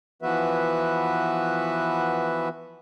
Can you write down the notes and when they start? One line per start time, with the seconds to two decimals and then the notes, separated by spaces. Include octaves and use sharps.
0.22 E3 F3 B3 F#4 B4 E5